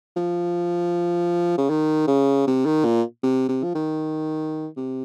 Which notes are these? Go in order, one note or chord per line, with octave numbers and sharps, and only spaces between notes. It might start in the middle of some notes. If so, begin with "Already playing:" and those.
F3
C#3
D#3
C#3
C3
D#3
A#2
C3
C3
F3
D#3
C3